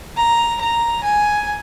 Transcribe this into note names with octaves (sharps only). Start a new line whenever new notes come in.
A#5
A#5
G#5